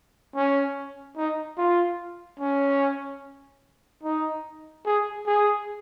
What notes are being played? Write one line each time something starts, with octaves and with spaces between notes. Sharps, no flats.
C#4
D#4
F4
C#4
D#4
G#4
G#4